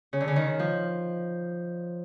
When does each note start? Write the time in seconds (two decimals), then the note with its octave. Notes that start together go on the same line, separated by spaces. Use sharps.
0.13 C#3
0.20 D3
0.28 C#3
0.36 D#3
0.59 F3